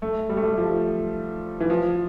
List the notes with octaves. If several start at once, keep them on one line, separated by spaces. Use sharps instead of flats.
A3
G3
A3
G3
F3
E3
F3